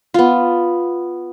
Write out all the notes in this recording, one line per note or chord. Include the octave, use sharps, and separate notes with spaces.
B3 F4